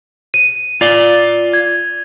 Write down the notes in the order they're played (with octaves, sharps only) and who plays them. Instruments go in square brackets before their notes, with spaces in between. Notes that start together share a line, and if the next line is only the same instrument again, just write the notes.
[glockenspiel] D#7
[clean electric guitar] F4 D5 [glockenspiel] F7 G7
[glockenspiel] G#6